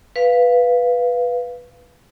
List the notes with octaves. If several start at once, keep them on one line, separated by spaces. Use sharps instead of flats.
B4 F5